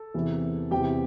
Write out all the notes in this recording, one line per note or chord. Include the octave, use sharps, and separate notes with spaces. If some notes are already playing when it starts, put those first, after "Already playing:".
Already playing: A4
E2 C3 E3
E2 C3 E3 G4 G5